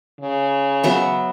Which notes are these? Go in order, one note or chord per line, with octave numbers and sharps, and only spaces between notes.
C#3
F#3 B3 E5